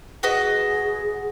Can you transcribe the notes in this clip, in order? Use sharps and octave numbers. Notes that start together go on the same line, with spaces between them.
F#4 G#4 B4 D#5